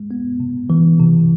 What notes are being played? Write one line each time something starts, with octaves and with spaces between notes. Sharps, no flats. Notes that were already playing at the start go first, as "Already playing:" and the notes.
Already playing: G#3
B3
C3
E3
C3